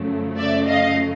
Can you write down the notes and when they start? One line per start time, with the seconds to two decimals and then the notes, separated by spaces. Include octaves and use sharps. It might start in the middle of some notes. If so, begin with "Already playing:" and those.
Already playing: F#2 C#3 F3 A3
0.37 D5 E5
0.66 D#5 F5